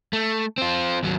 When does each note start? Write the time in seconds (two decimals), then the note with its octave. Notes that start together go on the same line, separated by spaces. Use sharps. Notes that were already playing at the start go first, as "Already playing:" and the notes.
0.13 A3
0.58 C4 F4
1.03 D#2 F#3